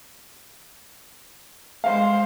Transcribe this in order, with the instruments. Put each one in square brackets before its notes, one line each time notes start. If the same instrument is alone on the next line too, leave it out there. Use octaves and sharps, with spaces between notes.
[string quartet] G#3 C5 [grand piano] F5